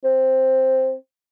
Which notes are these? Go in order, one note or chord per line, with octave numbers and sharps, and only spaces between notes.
C4